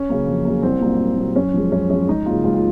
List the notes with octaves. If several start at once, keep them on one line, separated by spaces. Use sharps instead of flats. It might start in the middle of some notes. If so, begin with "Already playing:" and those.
Already playing: C#4
C#3 F#3 A#3
F2
C#3 F#3 A#3
C2 C4
A#2 F#3 A#3
C2
A#2 F#3 A#3
F#2 C#4
F3 G#3
F#2 C#4
F3 G#3 C#4
C#2 D#4
C#3 F#3 A#3 F4
C#2 F4
F4